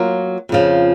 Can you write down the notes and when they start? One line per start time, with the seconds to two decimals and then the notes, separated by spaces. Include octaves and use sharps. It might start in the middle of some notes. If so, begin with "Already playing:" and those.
Already playing: F#3 A#3 F4 A#4
0.49 F2 C#3 F3